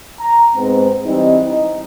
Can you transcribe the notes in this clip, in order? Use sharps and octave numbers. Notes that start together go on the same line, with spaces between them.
A#5
G#2 B3 C4
E3 G3 C4 D#4
D#4